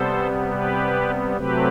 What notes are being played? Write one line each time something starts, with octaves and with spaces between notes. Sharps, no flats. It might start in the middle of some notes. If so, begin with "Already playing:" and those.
Already playing: C3 G3 B3 A4 C5
G4 B4
C3 F#3 A3 C4 G4 B4